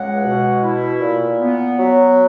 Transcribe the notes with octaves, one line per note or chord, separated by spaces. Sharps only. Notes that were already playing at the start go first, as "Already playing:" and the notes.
Already playing: C#2 G#3 F#5
B2
E4
A#2
B3
F#3